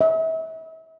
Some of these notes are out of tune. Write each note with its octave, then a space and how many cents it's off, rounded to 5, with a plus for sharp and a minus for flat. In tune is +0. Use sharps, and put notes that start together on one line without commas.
E5 -35